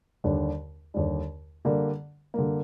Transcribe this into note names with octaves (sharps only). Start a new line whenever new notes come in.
D#2 D3 G3 D4
D#2 D3 G3 D4
D3 G3 A#3
D3 G3 A#3